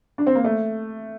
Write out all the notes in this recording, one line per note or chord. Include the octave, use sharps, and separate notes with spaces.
D4
C4
A#3
A3